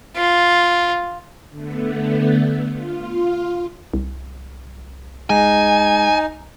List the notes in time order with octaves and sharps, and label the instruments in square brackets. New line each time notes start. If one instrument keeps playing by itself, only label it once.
[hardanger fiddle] F4
[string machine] D3 A3 B3
F4
[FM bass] C2
[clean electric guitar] G#3 [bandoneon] D#4 [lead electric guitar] G#5